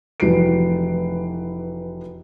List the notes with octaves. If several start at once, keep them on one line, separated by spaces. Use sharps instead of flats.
F1 E3 F#3 B4 C7 D7